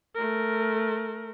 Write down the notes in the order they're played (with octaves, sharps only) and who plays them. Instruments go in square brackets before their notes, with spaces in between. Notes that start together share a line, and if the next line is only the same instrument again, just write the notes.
[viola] A3 A#4